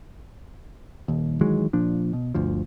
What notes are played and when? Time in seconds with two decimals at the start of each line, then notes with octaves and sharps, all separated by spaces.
1.08 D#1 D#2
1.41 D#3 E3 F#3 G#3
1.73 A#2 F3 D4
2.13 B2
2.34 G1 D2 F3